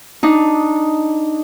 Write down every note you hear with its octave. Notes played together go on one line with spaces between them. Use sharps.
D4 D#4